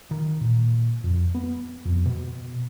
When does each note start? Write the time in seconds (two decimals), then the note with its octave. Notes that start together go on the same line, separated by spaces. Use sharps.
0.11 D#3
0.41 A#2
1.04 F2
1.35 B3
1.85 F2
2.06 B2